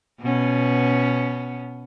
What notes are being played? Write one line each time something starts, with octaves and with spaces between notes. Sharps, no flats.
B2 B3 C#4